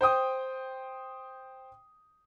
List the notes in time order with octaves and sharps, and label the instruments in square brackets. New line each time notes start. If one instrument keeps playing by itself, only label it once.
[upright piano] C5 G5 D#6